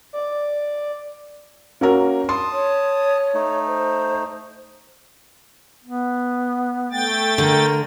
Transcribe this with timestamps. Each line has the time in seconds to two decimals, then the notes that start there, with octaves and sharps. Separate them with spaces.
0.13 D5
1.81 A#3 C#4 F#4 A#4
2.29 A5 C6 D#6
2.52 C#5
3.34 A3 D#4
3.67 C5
5.85 B3
6.92 A3 G5 A6
7.38 D3 A#4